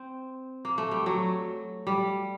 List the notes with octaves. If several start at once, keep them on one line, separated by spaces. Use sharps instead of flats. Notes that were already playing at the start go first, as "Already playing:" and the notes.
Already playing: C4
A#3
A3
G3
F#3
G3